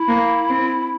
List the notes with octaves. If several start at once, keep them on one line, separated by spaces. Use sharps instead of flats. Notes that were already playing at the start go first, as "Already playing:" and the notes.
Already playing: E4
A#3
C4